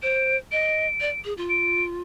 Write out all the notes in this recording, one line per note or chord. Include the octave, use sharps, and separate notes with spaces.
C5 D7
D#5 D7
D5
G#4
F4
D7